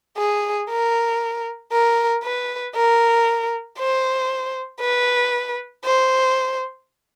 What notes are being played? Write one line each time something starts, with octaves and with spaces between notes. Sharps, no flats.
G#4
A#4
A#4
B4
A#4
C5
B4
C5